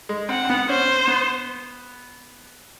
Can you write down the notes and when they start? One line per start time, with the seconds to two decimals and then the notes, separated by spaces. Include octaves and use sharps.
0.09 G#3
0.29 C4 F#5
0.45 C4
0.50 B3
0.69 C#4 C5
1.08 B3